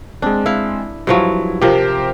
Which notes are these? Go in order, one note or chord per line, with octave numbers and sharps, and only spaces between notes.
G#3 C4 D4
E4 F5
G2 F3 F#3 E4
C3 F3 G4 A#4 C5